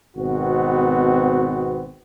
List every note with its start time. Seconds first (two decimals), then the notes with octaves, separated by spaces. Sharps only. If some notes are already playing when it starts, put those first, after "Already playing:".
0.16 G#1 B2 B3 C4 F#4